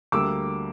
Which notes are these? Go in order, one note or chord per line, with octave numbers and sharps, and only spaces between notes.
D2 D3 G3 A#3 D6 E6